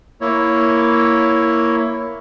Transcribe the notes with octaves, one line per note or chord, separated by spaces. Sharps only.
A#3 E4 C#5